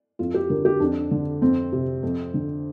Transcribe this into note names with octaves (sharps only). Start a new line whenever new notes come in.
F2 F4
G4
D3 A#4
G4
F2 D4
D3
F2 C4
C3
F2
D3